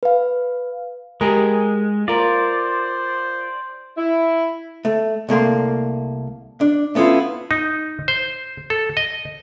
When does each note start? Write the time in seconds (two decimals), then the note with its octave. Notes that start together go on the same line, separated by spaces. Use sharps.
0.03 B4 F5
1.21 G#3 G4 G#4 A#4
2.08 F4 A#4 C5 D5
3.97 E4
4.85 A3
5.29 C2 A3 A#3 C6
6.61 D4
6.95 A3 B3 C#4 E4 F4
7.51 D#4
8.08 C5
8.70 A4
8.97 D#5